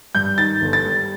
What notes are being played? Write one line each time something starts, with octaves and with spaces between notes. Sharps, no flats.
G2 G6
D#3 A6
G1
A6
G3